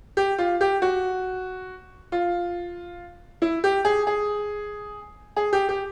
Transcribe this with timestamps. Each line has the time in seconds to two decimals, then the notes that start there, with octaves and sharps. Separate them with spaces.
0.17 G4
0.38 F4
0.61 G4
0.82 F#4
2.12 F4
3.42 E4
3.64 G4
3.85 G#4
4.07 G#4
5.37 G#4
5.53 G4
5.69 G4